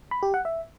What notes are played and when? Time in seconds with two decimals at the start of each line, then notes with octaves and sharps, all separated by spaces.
0.11 B5
0.23 G4
0.34 F#5
0.45 E5